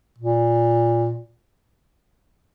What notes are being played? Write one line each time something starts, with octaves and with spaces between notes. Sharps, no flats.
A#2